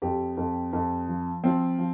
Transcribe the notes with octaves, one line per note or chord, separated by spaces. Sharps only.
F2 G4
F2
F2
F3
F3 C4
F3